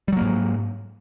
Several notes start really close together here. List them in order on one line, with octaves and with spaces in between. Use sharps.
G3 F#3 A#3 G#2